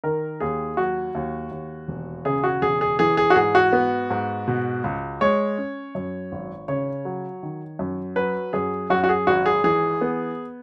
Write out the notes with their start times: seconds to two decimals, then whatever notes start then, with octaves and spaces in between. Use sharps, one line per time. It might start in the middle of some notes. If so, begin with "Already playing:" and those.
0.04 D#3 A#4
0.40 D#2 G#4
0.77 F#3 F#4
1.15 D#2
1.51 D#2
1.88 E1
2.25 C#3 G#4
2.44 F#4
2.62 E1 G#4
2.81 G#4
2.99 E3 G#4
3.17 G#4
3.30 F#4
3.36 G#2 G#4
3.55 F#4
3.73 B3
4.10 G#2
4.48 B2
4.84 C#2
5.21 G#3 C#5
5.58 C#4
5.95 F#2
6.32 G#1
6.68 C#3 C#5
7.05 F#3
7.43 D#3
7.79 F#2
8.16 F#3 B4
8.53 F#2 G#4
8.90 F#2 F#4
9.04 F#4
9.09 G#4
9.27 G#1 F#4
9.46 G#4
9.64 E3 G#4
10.01 B3